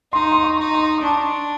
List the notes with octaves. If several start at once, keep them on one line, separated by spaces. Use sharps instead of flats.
D#4 C6
C6
C#6
D#4
C6
D6
D4 C#6